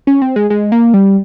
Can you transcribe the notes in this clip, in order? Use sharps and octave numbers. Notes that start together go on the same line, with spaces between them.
C#4
C4
G#3
G#3
A#3
G3